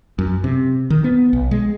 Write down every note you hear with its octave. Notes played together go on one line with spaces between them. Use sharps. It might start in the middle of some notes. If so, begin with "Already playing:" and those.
F#2
C3
D#3
B3
B1
G#3